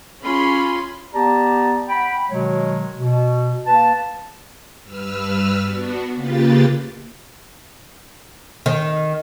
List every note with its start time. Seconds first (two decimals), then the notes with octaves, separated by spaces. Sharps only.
0.23 C#4 F4 G#4 B5 C6
1.14 B3 G4 D5 A5 A#5
1.89 F#5 G5 B5
2.29 B2 D#3 F#3 G#3 C#5
2.98 B2
3.66 A#3 B4 A5
4.83 G2 B4 E6 F6
5.62 B3 D4 F#4
6.15 C#3 A#3 F4 G4 B4 A6
8.66 D#3